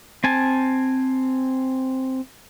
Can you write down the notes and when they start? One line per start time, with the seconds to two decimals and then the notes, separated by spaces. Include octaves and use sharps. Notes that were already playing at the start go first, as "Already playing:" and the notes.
0.24 C4 G#5 A5